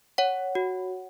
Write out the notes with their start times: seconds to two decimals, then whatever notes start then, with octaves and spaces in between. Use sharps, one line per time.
0.18 C#5 F#5
0.55 F#4